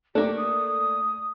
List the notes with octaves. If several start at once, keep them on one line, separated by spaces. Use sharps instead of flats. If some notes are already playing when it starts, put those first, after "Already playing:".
A3 A#3 D4 G4
D#6